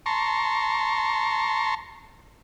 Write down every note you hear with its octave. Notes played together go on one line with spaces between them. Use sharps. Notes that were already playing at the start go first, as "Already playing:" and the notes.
A5 A#5 C6 C#6